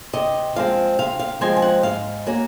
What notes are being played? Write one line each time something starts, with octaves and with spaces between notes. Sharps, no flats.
C3 D#5
F3 G#3 C4 F5
C3 F5
F5
F3 G#3 C4 G#5
G#5
F#5
G#2 F5
F#3 A#3 C#4